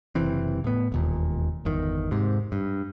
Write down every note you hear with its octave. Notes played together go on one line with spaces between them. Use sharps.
F#1 C3 E3 C4
A2 B3
E1 D#2 A#2
G1 E2 D#3
G#2 C3
G2